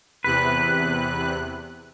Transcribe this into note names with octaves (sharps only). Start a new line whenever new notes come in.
E2 C3 B4 F#6